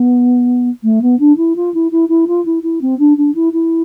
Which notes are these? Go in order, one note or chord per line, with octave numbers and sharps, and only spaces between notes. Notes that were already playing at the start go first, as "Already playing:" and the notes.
Already playing: B3
A3
B3
D4
E4
F4
E4
E4
E4
F4
E4
E4
C4
D4
D4
E4
E4